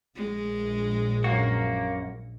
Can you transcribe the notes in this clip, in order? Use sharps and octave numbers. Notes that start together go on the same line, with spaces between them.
A#1 G#3
F#2 A#3 F#4